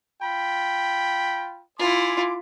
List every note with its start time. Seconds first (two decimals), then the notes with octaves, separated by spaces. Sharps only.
0.22 F4 G5 B5
1.79 E4 F4 G#5 C6 D6